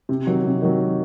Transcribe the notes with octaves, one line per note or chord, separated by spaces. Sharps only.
C3
D#3 F#3
C3
D#3 F#3